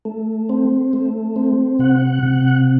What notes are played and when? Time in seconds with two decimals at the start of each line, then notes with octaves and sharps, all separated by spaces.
0.05 A3
0.49 C4
0.93 A3
1.36 C4
1.79 C3 F#5
2.23 C3